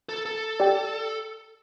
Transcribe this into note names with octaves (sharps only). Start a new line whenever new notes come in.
A4
A4
G4 D5 G5